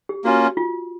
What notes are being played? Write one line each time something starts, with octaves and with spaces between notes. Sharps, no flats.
G4
A#3 C#4 F4 F#4
F4